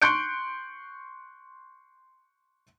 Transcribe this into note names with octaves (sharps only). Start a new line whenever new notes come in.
C6 C#6 F#6 G6 C#7 D7